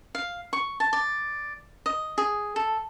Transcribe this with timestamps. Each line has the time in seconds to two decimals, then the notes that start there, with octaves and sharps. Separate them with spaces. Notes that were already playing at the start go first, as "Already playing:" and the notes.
0.15 F5
0.53 C#6
0.80 A5
0.93 D5
1.86 D#5
2.18 G#4
2.56 A4